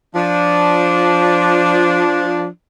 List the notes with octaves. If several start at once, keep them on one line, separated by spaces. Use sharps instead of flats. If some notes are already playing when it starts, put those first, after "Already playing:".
F3 D4